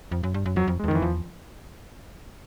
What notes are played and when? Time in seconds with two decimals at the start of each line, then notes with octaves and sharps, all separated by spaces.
0.12 F2
0.23 F#2
0.34 G2
0.46 F#2
0.56 F2 F#3
0.67 F2
0.79 G#3
0.84 E2
0.88 D#3
0.91 F2 E3
1.02 E2 F3